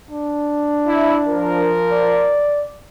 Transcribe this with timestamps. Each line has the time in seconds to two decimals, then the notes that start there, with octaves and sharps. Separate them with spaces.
0.11 D4
0.86 E4
1.28 F3 A#4
1.91 D5